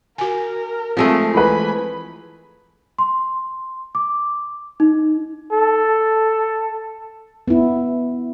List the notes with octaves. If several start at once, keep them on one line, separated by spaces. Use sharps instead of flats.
F#4 A#4 G#5
F3 G#3 A3 C4
E3 B4 G#5 B5
C6
D6
D#4
A4
B3 E4